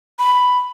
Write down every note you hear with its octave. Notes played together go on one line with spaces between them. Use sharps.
B5